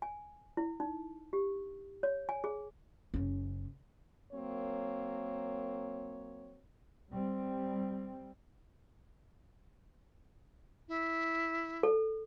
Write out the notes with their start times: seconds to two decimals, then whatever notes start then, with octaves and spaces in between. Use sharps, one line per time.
0.02 G#5
0.57 E4
0.80 D#4
1.33 G4
2.03 C#5
2.29 G#5
2.44 G#4
3.14 F#1 C#4
4.33 F#3 A#3 C4 A#4 C#5
7.12 G3 C4
10.88 E4
11.83 A4